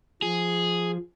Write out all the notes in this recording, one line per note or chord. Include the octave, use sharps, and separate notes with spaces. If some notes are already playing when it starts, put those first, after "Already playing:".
F3 G#4